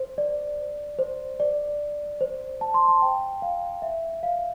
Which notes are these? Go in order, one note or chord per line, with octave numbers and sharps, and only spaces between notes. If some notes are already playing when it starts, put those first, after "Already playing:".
Already playing: C5
D5
C5
D5
C5
A5
C6
A5
G5
F5
E5
F5